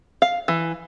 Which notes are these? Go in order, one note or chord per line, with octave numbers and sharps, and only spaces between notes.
F5
E3